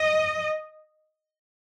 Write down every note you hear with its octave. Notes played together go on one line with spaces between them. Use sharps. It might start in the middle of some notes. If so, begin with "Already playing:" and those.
Already playing: D#5